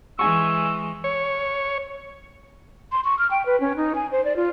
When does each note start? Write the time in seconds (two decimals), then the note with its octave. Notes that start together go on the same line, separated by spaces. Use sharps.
0.19 E3 G#3 G#5 C#6 E6
1.04 C#5
2.92 C6
3.04 C#6
3.19 F6
3.31 G5
3.46 B4
3.60 C#4
3.76 D#4
3.95 G#5
4.11 C5
4.25 D5
4.36 F4